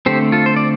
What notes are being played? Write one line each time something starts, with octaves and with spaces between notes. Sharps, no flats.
D3 A3 C4 G4 C5
F4 A4
C5
D5